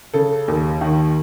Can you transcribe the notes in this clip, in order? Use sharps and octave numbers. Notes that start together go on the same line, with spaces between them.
C#3 A4
D#2
D#3